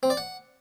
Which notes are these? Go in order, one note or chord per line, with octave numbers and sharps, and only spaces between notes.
C4
D5
F#5